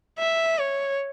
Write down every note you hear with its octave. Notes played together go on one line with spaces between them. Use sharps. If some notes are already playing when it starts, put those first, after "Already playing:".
E5
C#5